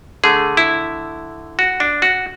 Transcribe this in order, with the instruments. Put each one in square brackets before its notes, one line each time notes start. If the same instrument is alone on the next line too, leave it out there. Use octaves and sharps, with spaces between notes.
[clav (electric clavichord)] D3 A3 G#4
E4
F#4
D4
F#4